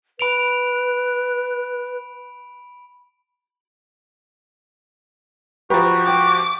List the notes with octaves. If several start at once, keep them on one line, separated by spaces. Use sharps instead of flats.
B4 B5 D7 F7
F3 F#4 G4 B4 A#5 B5
G5 D6